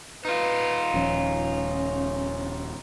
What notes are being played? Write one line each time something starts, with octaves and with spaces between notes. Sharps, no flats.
D#4 F4 B4
D#1 F3 C#4